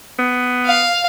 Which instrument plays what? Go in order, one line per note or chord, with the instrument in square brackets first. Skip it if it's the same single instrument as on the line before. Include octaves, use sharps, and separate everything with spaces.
[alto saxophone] B3
[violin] F5